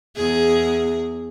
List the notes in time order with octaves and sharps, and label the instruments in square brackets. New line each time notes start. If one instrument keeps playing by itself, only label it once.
[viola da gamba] E2 G#4